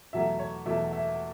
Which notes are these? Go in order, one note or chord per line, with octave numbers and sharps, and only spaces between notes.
E2 B2 F#3 A3 E5
C#5
E2 B2 F#3 A3 E5
E5